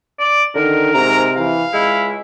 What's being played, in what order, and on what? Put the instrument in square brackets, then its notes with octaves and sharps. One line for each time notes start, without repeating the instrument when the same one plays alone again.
[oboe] D5
[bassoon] D3 [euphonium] D#3 [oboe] A#4
[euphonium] G#2 [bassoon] C3 [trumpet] A#5
[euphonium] E3 [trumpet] F5
[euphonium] C#2 [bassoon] G#3 [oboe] E4